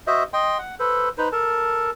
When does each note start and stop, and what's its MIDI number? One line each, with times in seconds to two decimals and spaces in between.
0.07 0.23 66
0.07 0.23 72
0.07 0.23 75
0.07 0.23 76
0.33 0.58 75
0.33 0.58 79
0.33 0.58 84
0.59 0.75 78
0.80 1.09 69
0.80 1.09 71
0.80 1.09 72
1.18 1.29 63
1.18 1.29 71
1.18 1.29 72
1.32 1.90 69
1.32 1.90 70
1.32 1.90 81